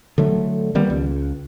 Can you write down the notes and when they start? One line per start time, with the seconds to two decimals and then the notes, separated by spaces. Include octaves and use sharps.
0.18 D3 F#3 A3
0.75 D#3 G3 A#3 B3
0.90 C#2